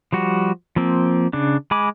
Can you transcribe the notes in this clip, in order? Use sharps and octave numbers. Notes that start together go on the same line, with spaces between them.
F3 G3 F#4
F3 A#3 C4
C#3 D4
G#3 G#5 B5 D6